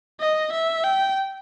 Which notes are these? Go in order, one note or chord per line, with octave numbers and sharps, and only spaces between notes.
D#5
E5
G5